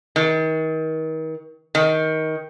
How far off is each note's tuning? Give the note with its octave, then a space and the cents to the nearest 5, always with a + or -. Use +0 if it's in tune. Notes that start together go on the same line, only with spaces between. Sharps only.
D#3 +35
D#3 +20